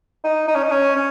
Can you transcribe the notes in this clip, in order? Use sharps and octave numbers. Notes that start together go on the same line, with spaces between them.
D#4
D#4
C#4
D#4
C#4
C#4